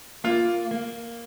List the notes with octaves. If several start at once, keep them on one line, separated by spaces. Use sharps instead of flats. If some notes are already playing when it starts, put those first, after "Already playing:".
A#3 F4
A#3